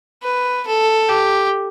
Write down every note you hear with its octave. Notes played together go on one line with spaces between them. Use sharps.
B4
A4
G4